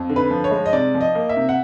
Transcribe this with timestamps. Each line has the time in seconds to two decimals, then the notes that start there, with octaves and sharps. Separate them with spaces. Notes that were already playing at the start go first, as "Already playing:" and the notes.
Already playing: F2
0.09 D3
0.16 B4
0.30 F3
0.44 C#5
0.51 G#3
0.66 D#5
0.73 C3 D5
0.95 F3
1.01 D#5
1.15 A#3
1.29 E5
1.36 C3
1.49 F#5